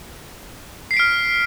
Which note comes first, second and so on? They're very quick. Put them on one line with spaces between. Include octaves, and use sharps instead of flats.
C7 B6 D7 F6